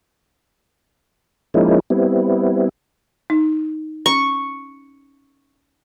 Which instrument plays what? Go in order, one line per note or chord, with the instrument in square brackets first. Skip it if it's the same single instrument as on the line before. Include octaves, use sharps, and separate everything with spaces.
[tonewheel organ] F3 G#3 A#3 C#4 D#4 E4
G3 B3 C4 E4
[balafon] D#4
[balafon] C#4 [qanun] C#6